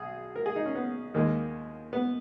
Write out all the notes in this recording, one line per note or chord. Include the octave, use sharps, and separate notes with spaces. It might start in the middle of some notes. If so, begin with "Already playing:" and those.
Already playing: B1 G#4
A#4
G#4
D#4
C#4
B3
D#2 D#3 G#3 A#3
B3